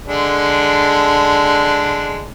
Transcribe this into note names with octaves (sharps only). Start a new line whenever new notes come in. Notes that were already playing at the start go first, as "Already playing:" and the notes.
D3 G#3 D4